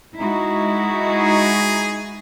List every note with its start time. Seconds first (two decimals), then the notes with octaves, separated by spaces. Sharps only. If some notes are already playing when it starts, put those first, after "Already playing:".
0.18 G#3 D#4 E4 F#4
1.08 G#4